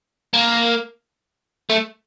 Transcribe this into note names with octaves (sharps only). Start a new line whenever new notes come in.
A#3
A3